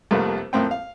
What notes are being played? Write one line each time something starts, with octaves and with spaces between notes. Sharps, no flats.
C2 F2 G3 A3 A#3 B4
F2 A2 A#3 C4 G5
F5